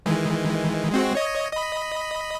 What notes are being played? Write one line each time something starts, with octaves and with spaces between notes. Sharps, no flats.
D#3 E3 G#3
G#3 C4 F#4
C#5 D#5
D#5 B5